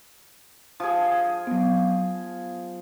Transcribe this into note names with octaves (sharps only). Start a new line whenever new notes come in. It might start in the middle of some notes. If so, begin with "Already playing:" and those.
F3 G#4
F#3 B3